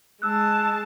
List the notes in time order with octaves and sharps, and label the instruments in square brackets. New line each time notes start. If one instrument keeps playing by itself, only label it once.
[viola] G#3 A5 [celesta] E6 F#6